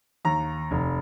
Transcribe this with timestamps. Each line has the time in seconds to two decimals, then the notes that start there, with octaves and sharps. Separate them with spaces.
0.25 D#2 A#5
0.71 F1